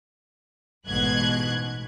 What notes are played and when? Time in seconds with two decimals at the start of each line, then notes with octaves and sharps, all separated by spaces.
0.87 A1 G#2 B2 F#6 G#6